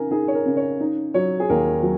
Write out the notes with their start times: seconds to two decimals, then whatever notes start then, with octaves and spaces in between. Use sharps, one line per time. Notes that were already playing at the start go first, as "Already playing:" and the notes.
Already playing: C#3 D#4 A#4 G#5
0.11 D#4 G#4
0.28 C#5
0.35 A#4
0.46 C#3
0.57 C#5
0.80 D#4
1.14 F#3 C#5
1.40 G#4
1.49 D#2 A#4
1.83 F#3